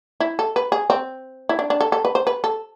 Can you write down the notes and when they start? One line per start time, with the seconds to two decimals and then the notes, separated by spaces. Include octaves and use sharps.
0.20 E4
0.39 A4
0.56 B4
0.72 G#4
0.90 C4
1.49 E4
1.59 D4
1.70 D4
1.81 A4
1.92 A4
2.05 B4
2.15 C5
2.27 B4
2.44 A4